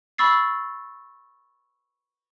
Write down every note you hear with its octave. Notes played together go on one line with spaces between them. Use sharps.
B5 C#6 E6 A6 C7